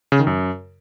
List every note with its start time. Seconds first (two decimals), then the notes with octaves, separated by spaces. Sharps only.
0.12 C#3
0.19 D#3
0.27 F#2